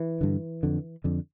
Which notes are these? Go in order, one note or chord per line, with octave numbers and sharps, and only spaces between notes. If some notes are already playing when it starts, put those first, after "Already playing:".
Already playing: E3
G2 D3
F2 D3
F2 D3